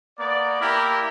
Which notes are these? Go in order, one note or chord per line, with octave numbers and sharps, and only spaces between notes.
A#3 B3 D5
A#3 E4 G4 A#4